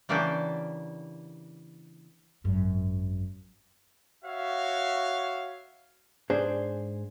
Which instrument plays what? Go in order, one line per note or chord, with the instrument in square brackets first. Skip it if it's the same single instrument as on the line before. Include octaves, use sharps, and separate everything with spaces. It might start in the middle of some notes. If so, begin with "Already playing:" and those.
[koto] C#3 E3 A#3 D4 F#4 G4
[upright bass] G#1 F#2
[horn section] F#4 C#5 E5 F5
[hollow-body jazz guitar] G#2 D4 G#4 C5